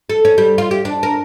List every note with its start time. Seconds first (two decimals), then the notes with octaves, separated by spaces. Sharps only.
0.09 A4
0.25 C#4
0.38 G3
0.58 F4
0.71 G4
0.85 D4
1.03 A#4